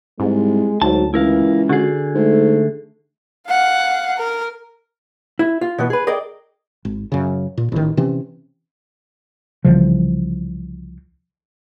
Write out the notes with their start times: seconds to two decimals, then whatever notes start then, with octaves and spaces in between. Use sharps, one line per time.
0.20 C2 G#2 G#3
0.82 D2 G#2 F#3 A5
1.14 C#2 E3 E4 A#4 F5
1.69 D3 F#4 G#4
2.15 G#2 A3
3.48 F5 F#5
4.17 A#4
5.39 E4
5.61 F4
5.78 B2 E3 B3
5.90 G#4 B4
6.07 G#4 A#4 D5 D#5 G5
6.85 G#1
7.12 F#2 C#3
7.58 A#2
7.72 A1 D#3
7.97 C3 E3 C4 C#4
9.64 C2 C#3 E3 F3